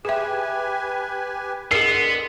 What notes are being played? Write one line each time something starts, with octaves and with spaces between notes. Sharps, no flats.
G4 G#4 B4 E5 G#5
D3 G#3 B3 G#4 A#4 C7